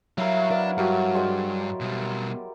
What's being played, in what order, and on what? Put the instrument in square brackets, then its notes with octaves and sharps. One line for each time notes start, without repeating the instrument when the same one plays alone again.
[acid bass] F#3 [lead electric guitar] G3 F5 [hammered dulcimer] E4 A#4
[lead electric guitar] D4 D5 [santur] B4 F5
[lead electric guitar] G2 [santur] F#4 G4 C6 [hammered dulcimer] A#4
[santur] G#3 G4 D5 [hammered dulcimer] C6
[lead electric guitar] B2 G3